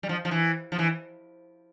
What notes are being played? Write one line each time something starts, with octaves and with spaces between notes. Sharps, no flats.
G3
F3
F3
E3
F3
E3